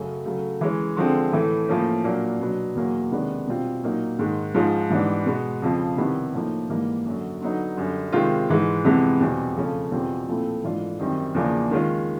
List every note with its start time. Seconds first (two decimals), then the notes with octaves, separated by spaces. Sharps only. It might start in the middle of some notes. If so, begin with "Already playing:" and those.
Already playing: F#2 C#3 F#3 A3
0.25 C#3 F#3 A3
0.61 E3 G#3 C#4
0.97 D3 F3 G#3 C4
1.32 A2 E3 A3
1.68 A2 F3 A#3 C#4
2.04 A#2 F#3 A#3 D4
2.40 B2 F#3 B3 D4
2.75 E2 B2 F#3 A#3
3.12 C3 D#3 G#3 B3 D4
3.47 B2 G3 C4 F4
3.83 A#2 F#3 A#3 D#4
4.18 G#2 D#3 G#3
4.54 G#2 F3 G#3 C#4 F4
4.90 G#2 E3 G3 B3 D4
5.26 B2 G#3 B3
5.62 F2 C#3 F3
5.97 C3 D#3 G3 B3 E4
6.34 A2 F3 A#3 D#4
6.69 G#2 E3 G3 A#3
7.05 F#2 D3 F#3
7.41 D3 F#3 B3 D#4
7.77 F#2 D3 G3
8.12 C3 D#3 G#3 C4 F4
8.49 G#2 E3 G#3
8.84 F2 C3 E3 G#3 B3
9.20 E2 B2 G3 C4
9.56 F2 C#3 F3 A3 C#4
9.91 E2 B2 G3 C4 F4
10.28 A#2 F3 A3 C4 E4
10.64 G#2 E3 A3 D4 F4
10.99 F#2 D#3 G3 C4
11.35 E2 C#3 F3 A#3 D4
11.71 D#3 G#3 C#4 F4